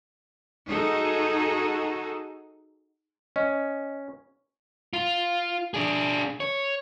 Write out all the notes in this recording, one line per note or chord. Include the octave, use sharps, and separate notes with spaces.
D#4 F#4 G#4 A4
C#4 D#5
F4
D4 G#4
C#5